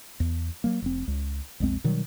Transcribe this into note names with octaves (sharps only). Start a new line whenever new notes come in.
E2
F#3 A#3
F1 C4
C#2
A#1 E2 G#3 C4
B2 D#3 F#3 G3